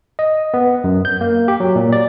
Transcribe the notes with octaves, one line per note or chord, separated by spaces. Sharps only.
D#5
B3
F#2
G6
A#3
G4
F#3
A#2
D5